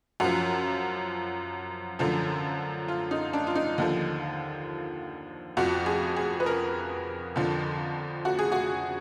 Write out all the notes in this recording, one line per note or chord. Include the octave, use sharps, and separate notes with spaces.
F#2 F3 F#4
F#2 D3 F3
F4
D#4
D4
F4
D#4
D#2 D3 F3
F2 F3 F#4
G#4
G#4
B4
A#4
F2 D3 F3
F#4
G#4
F#4